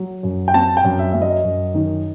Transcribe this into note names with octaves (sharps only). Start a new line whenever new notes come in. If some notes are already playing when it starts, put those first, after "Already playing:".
Already playing: F#3
F#2
G5
C4 A5
G5
F#2
E5
F#3 E5
D#5
F#2
D#3